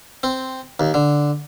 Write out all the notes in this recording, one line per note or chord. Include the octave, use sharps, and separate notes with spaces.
C4
D#2
D3